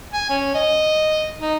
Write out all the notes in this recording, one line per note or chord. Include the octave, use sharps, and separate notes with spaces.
G#5
C#4
D#5
D#4